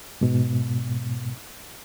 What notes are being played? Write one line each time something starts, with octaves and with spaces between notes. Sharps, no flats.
G#2 B2